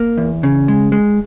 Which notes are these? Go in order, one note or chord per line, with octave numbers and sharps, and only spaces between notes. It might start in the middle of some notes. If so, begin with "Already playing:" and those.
Already playing: A#3
E2
C#3
G#3
G#3